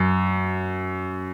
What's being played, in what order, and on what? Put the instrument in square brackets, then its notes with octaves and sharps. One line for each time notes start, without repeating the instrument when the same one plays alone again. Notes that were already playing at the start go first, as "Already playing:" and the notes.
Already playing: [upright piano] F#2